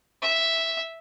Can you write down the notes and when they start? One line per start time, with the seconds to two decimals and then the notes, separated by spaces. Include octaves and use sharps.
0.23 E5